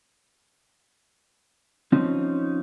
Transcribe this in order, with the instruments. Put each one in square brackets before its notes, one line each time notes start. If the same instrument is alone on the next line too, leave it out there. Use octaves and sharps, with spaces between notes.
[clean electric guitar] F3 C4 C#4 D#4